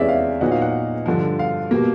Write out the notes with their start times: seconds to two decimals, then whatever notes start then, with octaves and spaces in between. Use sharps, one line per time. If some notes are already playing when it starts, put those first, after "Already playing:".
Already playing: E2 C3 E3 G#3 C#4 D5 E5
0.08 F5
0.41 A#2 F#3 B3 D#4 F#5
0.52 F5
0.62 F#5
1.06 G2 D3 F3
1.39 F5
1.71 B2 G3 A#3